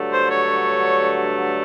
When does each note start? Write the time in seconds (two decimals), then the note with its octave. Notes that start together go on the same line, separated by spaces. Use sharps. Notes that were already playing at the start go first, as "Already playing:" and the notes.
Already playing: G2 D3 F#3 A3
0.13 C5
0.30 C#5